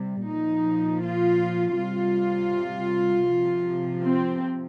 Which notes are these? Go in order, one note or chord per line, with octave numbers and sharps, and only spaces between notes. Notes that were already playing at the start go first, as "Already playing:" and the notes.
Already playing: C3 G3
A#2 F3 D#4
F4
C3 G3 F4
C3 F3
C4